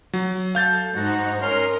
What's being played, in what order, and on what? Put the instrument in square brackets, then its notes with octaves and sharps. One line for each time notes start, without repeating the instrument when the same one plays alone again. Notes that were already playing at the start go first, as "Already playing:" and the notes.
[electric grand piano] F#3
[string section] A4 [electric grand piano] F5 G6 A6
[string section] G#2 D#4 C5 [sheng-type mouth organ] F#4 F#5
[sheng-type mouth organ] C#4 C6 F6 [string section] A#4 C#5 D#5